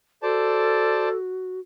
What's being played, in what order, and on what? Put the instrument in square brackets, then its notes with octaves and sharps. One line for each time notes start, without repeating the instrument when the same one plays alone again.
[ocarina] F#4 [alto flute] A4 [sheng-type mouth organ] C5 D5 A5